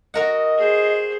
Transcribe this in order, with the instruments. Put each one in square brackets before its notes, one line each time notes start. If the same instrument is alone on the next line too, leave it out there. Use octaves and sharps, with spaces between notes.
[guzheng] F#4 A#4 F#5 [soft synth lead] D#5
[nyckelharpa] G#4 C5